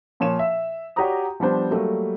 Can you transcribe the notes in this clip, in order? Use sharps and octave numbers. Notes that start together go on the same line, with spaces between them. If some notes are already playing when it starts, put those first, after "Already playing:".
A#2 F3 C#5 E7
E5
F#4 G4 C#5 D5 A#5 D#6
F3 G3 B3 D4 C5
F#3 G3 A3 A#3